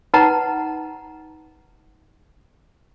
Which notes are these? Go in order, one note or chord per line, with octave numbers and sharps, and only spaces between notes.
D#4 B4 F#5 A5 A#5